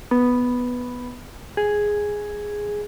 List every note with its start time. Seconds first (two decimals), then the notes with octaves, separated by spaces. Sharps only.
0.11 B3
1.57 G#4